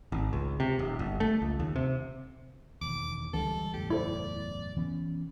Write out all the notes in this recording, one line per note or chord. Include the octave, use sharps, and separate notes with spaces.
G#1
C#2
C3
D#1
G1
A3
C#2
D#2
C3
E1 D#2 D6
C#2 D3 E3 G3 G#3 A4
F#1 E2 A2 G4
E4 A4 C5 D5
E3 B3 C#4